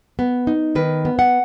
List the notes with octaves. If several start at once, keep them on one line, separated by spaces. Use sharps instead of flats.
B3
D#4
D#3 B4
B3
F#5